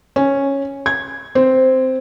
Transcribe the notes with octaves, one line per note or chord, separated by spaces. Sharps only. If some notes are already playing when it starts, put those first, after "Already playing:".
C#4
G#6
C4